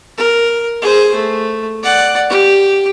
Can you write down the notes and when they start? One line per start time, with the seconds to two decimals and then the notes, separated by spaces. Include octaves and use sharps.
0.17 A#4
0.82 G#4 C5
1.15 A3
1.82 D5 F#5
2.30 G4